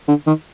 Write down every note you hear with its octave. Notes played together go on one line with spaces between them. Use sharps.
D3
D#3